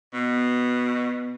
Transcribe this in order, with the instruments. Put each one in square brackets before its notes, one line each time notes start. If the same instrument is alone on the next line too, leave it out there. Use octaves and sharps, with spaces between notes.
[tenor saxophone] B2 [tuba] B3